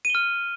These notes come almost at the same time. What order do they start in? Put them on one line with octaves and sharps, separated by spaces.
D#7 G7 F6